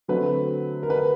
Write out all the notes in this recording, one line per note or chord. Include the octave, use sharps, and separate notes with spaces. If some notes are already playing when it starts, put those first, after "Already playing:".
D3 F#3 A3 C4 B4
A#4
B4